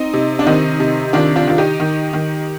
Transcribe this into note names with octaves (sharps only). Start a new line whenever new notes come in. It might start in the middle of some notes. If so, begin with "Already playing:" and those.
Already playing: C4 D#4
C3
D4
D#3 C4 D#4
C3
D#3 D4 F4
D4 F4
D#3 F4
D#4 G4
D#3
D#3